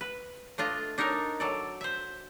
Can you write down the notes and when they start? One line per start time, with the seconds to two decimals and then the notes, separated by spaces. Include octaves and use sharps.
0.01 B4
0.58 A3 D4 F4 D#5
0.98 D4 D#4 A4 A#4 C#5
1.40 F#3 A4 D5
1.81 C5 E5